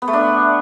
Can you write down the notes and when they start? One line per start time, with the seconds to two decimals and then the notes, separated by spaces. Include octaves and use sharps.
0.02 B3
0.08 A3
0.13 D4